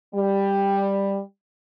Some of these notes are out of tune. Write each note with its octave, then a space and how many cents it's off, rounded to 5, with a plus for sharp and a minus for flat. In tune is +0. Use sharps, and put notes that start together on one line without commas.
G3 +10